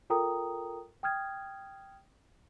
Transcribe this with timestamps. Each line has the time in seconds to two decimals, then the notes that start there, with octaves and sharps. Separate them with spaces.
0.10 F4 A4 A#4 G5 A#5 D#6
1.03 G5 D#6 F6 G#6